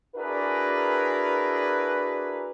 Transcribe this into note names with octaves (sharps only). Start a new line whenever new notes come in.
D4 E4 F#4 G#4 A#4 B4